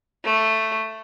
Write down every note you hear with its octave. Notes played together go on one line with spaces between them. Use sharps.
A3